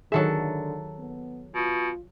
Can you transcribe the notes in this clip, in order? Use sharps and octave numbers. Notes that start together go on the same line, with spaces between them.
D3 D#3 F#3 G#4 A4 E5
B3
B2 F4